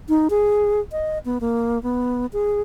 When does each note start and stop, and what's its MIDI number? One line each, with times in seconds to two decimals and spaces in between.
0.09 0.28 63
0.30 0.80 68
0.92 1.18 75
1.25 1.38 59
1.41 1.81 58
1.83 2.26 59
2.33 2.61 68